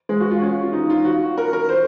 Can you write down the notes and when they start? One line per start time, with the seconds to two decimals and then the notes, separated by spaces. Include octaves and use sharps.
0.09 G#3
0.20 F#4
0.31 F4
0.42 C#4
0.63 F4
0.73 D#4
0.90 F4
1.05 F#4
1.38 A#4
1.53 A#4
1.69 C5